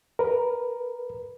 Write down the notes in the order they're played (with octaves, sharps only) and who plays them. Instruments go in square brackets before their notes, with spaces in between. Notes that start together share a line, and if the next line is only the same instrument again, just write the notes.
[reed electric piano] A#4 B4